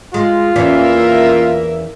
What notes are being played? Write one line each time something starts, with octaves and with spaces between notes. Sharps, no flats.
G#3 F4
E2 E3 A#3 C#4 A#4 E5